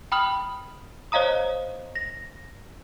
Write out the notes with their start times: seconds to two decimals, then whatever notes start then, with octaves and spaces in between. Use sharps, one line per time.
0.12 G5 B5 D#6 F6 F#7
1.12 C5 C#5 D#5 F5 A#5 D#6
1.95 A#6